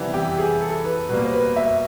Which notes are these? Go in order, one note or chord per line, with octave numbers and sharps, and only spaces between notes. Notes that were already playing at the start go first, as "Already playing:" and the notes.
Already playing: C3 E3 G3 B3
G4
G#4
A4
B4
B2 G3 A#3 B4
C5
B4
E5